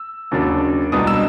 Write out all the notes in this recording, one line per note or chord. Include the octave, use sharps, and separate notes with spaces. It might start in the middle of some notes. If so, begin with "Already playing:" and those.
Already playing: E6
D#2 C#3 F#3 A#3 D4
C2 B2 G#3 B3 D4 D#6
E6